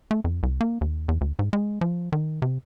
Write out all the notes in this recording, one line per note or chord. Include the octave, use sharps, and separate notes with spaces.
A3
F2
C2
A#3
D#2
E2
D2
G#2
G#3
F3
D#3
C3